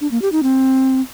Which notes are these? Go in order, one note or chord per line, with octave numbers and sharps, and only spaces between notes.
D4
A#3
G4
D#4
C4